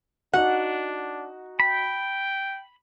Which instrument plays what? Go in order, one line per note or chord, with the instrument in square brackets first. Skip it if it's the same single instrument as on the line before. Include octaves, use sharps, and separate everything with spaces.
[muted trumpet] D4 [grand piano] D#4 F#4 [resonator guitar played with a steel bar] F#5
[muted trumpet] G5 [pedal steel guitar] B5